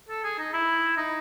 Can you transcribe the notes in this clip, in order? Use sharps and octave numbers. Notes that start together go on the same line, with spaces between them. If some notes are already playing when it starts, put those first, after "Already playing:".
A4
G#4
D#4
E4
D#4